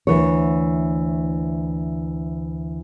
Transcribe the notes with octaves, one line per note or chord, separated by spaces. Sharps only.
D2 E3 C#5